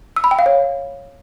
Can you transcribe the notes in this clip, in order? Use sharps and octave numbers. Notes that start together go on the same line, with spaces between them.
E6
B5
G5
F5
C#5